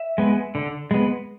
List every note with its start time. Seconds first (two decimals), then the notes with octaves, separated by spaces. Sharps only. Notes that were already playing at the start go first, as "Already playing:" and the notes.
Already playing: E5
0.18 G#3 B3
0.55 D3
0.91 G#3 B3